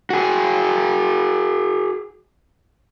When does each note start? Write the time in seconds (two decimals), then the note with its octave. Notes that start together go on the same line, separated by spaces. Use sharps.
0.10 F#4 G#4